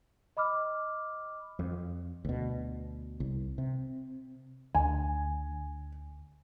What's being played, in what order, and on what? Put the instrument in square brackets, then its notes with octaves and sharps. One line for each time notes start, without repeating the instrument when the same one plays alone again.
[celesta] D#5 B5 D6 F6
[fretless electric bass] F2
D2 B2
C2
C3
[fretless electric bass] D2 [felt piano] G#5